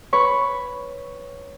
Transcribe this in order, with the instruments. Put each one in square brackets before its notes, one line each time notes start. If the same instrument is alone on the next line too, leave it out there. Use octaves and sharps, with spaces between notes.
[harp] B4 C#5 B5 C#6